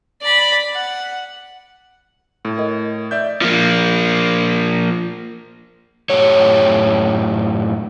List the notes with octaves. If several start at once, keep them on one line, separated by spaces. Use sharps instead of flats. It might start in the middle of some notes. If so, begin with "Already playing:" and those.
D5 B5
F#5
A2
A#4 D#5
D5 E5 G6
F3 A#3
F#2 A2 G4 C#5